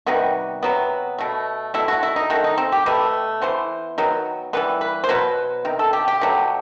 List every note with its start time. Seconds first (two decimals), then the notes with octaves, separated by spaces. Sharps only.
0.06 C3 D#3 G3 B3 F#4
0.63 C3 F#3 B3
1.19 B2 A3
1.74 B2 A3 E4
1.88 F#4
2.03 E4
2.16 D#4
2.30 D#3 A3 F#4
2.44 D#4
2.58 C4
2.72 G4
2.86 B2 A3 B4
3.42 E3 B3 C5
3.98 D#3 F#3 B3
4.53 E3 G3 B3 B4
4.81 B4
5.04 C5
5.09 B2 F#3 B3 B4
5.65 C3 D#3
5.79 A4
5.93 G4
6.08 G4
6.21 B2 F#3 A3